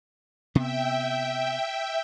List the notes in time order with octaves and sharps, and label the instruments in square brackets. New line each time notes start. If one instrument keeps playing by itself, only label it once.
[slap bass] C3 B3 [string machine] E5 G5